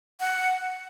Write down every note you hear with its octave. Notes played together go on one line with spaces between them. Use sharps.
F#5